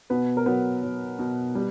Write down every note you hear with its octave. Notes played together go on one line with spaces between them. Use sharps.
B2 B3 B4
A#4
F#3 B3 B4
F#3
B2
G3